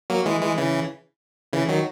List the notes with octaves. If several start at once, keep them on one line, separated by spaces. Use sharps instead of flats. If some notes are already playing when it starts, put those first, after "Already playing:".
F#3 A#3
E3 G#3
E3 G#3
C#3 E3
C#3 E3
D#3 F#3